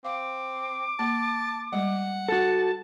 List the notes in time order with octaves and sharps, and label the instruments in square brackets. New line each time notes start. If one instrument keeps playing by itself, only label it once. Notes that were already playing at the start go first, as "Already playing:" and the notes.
[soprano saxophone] C4 [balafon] F5 [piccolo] D6
[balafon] A#3 [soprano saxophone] A5
[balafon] G3 G#3 [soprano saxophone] F#5
[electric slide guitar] F#4 A4 [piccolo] A5